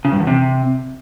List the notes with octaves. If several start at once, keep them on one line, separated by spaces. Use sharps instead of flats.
C#3
G2
E2
C3